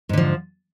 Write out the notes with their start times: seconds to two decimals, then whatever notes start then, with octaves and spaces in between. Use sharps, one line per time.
0.09 G#2
0.13 D3
0.18 F3